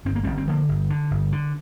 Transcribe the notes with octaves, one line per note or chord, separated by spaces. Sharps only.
G1 C4
A#3
G1 G3 C4
C4
D3 F3 A#3
G1
D3
G1
D3